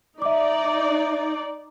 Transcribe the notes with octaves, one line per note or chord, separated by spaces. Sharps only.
D#4 D5 E5 D6